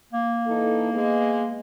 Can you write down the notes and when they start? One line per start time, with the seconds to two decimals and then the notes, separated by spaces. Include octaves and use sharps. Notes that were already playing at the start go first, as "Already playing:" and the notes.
0.13 A#3
0.47 E3 D#4 A4
0.93 G#3 B3